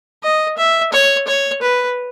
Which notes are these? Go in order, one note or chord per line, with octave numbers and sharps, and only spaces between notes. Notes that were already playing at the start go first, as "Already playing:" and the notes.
D#5
E5
C#5
C#5
B4